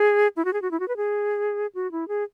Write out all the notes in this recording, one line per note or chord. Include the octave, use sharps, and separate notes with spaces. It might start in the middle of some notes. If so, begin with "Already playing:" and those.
Already playing: G#4
E4
F#4
G#4
F#4
E4
F#4
B4
G#4
F#4
E4
G#4